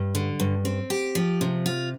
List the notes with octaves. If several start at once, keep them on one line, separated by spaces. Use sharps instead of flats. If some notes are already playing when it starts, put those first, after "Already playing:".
Already playing: G2
D3
G2
C4
G4
F3
C3
F4